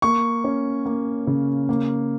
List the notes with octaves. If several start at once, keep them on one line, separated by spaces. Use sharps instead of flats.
A#3 C#6
C#4
A#3
C#3
A#3